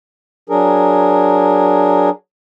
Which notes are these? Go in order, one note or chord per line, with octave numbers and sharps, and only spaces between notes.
F#3 D4 G#4 A#4